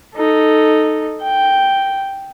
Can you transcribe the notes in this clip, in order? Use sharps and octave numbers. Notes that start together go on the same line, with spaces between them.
D#4 A4
G5